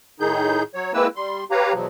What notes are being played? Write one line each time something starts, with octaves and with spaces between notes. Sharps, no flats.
A2 D#3 D#4 G#4 G6
F#3 C#5
G#3 A#3 C4 E4 B4 E6
G3 C6
G4 B4 C#5 F5 A#5
E2 B2 F3 F#3